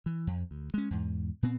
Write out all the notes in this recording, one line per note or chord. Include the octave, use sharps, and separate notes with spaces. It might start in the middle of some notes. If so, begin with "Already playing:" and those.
E3
F2
D2
G#3 C#4
E2 G#2
A#2 B3 C4